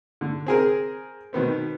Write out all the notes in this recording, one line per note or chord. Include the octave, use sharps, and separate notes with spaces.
D3
C4 G#4 A#4
B2 D#3 B3 C4